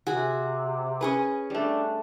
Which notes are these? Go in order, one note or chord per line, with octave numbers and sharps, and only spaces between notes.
C3 F#4 G#4
C#4 G#4 B4
G3 A3 D4